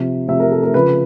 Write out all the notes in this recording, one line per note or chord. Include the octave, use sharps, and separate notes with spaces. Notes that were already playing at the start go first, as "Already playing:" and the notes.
Already playing: C3 F3
C3 F3 E5
A#4
A4
A#4
C#3 F3 B4